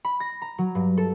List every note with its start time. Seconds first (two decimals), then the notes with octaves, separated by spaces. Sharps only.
0.05 B5
0.20 A#6
0.42 A#5
0.58 F#3
0.75 G2
0.98 A4